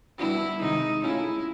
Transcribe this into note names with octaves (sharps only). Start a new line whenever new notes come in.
G3 B3 D4 E4 F#4
C3 D#3 G#3 D#4
A3 C#4 E4 F4 G#4